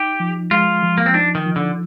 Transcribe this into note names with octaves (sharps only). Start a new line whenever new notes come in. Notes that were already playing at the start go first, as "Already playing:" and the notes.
Already playing: D#4 G4
F3
G#3 F4
F3
A#3
C4
D4 D#4
D#3
F3
D3